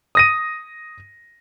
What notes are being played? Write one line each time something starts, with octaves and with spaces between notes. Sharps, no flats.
D#6 A#6 D#7